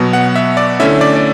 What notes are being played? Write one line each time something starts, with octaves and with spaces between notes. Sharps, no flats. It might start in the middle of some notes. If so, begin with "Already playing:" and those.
Already playing: B2 F#3 B3
F#5
E5
D5
D3 A3 C#4 E4 E5
D5
D5